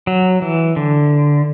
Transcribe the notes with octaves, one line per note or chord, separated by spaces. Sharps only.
F#3
E3
D3